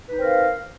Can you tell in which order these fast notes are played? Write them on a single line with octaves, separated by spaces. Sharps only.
B4 D#4 C4 A#4 F5